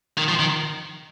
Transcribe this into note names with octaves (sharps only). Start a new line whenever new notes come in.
D#3
F3
D#3